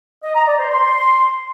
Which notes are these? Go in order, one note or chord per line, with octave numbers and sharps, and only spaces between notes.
D#5
A#5
D5
C5
C6